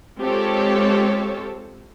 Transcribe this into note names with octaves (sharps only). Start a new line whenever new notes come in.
G#3 C4 F4 G4 A4 C#5